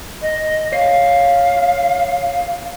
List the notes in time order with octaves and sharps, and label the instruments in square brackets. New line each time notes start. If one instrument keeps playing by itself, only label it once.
[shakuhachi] D#5
[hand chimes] C#5 C7 [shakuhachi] F5